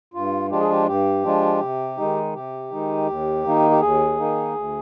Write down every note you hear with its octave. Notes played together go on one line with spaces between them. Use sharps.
G2 F4
F3 G#3 D4 F4 G4
G#4
G4
G2 G4
F3 G#3 D4 F4
C3
D#3 G#3 D#4
C3 G4
D#3 G#3 D#4
D#2
D#3 A#3 D#4
G4
D#2 G#4
D#3 A#3 D#4
D2